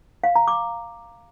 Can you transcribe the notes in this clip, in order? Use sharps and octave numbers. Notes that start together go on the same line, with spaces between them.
F5
A#5
D6